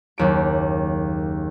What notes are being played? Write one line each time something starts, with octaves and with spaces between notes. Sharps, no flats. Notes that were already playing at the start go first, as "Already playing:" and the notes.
F#1 D#2 D7